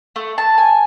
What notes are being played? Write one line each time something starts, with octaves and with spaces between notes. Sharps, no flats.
A3
A5
G#5